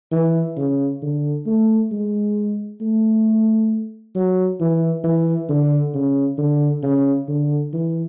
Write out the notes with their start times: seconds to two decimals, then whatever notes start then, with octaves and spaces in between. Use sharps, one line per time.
0.12 E3
0.56 C#3
1.02 D3
1.46 A3
1.92 G#3
2.81 A3
4.15 F#3
4.60 E3
5.04 E3
5.49 D3
5.94 C#3
6.38 D3
6.83 C#3
7.28 D3
7.73 E3